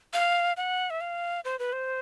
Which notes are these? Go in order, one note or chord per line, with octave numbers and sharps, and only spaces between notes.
F5
F#5
E5
F5
C5
B4
C5